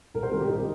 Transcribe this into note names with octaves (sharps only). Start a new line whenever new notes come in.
C2 A#4
C5
C3 D#3 G3 A#4
G4
C2 D#4